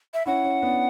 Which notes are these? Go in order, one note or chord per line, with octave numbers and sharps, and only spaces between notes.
E5
C#4 E4 F#5
C#4
B3 D4